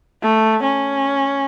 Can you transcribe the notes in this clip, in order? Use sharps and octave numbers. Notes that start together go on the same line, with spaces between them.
A3
C#4